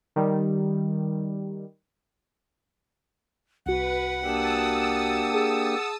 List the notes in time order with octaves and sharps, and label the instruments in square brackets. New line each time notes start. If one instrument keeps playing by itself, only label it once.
[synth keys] D#3 G3
[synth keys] C2 F#4 [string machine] B4 [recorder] F#5
[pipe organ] A#3 D4 G4 [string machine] A5 D#6 E6
[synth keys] G#4